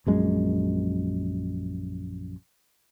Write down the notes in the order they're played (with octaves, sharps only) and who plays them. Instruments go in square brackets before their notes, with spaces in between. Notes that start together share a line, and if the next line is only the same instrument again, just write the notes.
[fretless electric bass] A#1 F#2 G#3